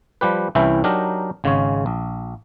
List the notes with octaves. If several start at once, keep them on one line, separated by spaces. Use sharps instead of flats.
F3 G3 G4 B4
C2 E3 C#4 E4 E5 G5
F#3 D4 D#4 G4 A#4
G#1 C#3 G#3 C#4 C#5
A#1